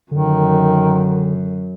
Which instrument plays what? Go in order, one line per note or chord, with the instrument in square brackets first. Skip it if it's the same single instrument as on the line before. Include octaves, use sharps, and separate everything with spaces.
[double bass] F#2 [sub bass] D3 [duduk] D#3